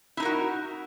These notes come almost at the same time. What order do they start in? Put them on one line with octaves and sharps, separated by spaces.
E4 D#4 A#4 F#4